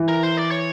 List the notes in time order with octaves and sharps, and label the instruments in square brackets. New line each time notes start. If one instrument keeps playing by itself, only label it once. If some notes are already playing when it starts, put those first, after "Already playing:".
Already playing: [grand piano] E3
[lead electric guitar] A#4
C5
D5
C#5